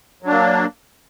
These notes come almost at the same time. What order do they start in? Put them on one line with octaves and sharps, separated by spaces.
F#3 D4 A#3